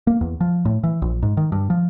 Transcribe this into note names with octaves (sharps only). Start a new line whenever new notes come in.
A#3
E2
F3
A2
E3
A#1
G#2
D#3
G2
F3